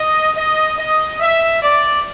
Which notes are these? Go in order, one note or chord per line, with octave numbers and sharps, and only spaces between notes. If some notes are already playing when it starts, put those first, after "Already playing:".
Already playing: D#5
D#5
D#5
E5
D5